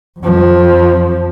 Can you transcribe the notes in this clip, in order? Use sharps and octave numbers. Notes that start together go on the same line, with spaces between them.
F2 F3